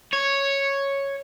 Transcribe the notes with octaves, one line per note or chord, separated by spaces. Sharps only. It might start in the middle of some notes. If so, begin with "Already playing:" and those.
C#5